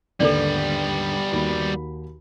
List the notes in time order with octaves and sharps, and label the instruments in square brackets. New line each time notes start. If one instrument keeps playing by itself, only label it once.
[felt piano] D#2 G#2 D3 [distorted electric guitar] G3 B3 [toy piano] A4 B4 D5
[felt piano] D#2 F#4 B5